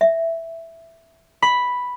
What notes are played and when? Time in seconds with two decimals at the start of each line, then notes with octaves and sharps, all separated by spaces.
0.01 E5
1.42 B5